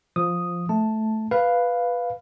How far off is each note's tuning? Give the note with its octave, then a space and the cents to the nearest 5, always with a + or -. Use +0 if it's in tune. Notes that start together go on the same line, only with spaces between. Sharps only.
F3 +0 D#6 +0
A3 -10 A5 +0
B4 +0 F5 +0